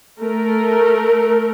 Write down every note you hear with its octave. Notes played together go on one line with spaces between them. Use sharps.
A3 A#4